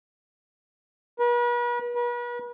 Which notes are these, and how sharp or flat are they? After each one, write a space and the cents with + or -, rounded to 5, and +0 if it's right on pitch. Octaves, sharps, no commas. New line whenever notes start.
B4 -40
B4 -40